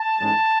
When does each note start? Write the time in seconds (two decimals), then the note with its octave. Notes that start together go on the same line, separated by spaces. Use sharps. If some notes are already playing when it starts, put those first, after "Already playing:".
Already playing: A5
0.20 A1 G#2 G#3 C#4